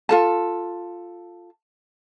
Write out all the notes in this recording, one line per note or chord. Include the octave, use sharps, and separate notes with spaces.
F4 A4 A5